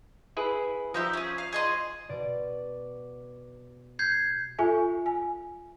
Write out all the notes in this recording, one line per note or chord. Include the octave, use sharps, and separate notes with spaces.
E4 G#4 B4
F3 D#4 G4 E5
C#4 G#4
F5
G#4 D#5 C6
B2 D5 D7
G6 G#6 C7
F4 A4 E5 G#5
G#5